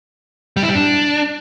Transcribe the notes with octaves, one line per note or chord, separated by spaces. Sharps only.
G3
E4
G3
D4